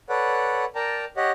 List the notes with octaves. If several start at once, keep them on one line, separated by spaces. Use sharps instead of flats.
A4 B4 C#5 D5 F#5
A#4 D5 G5 A5 A#5
G4 C#5 D#5 F#5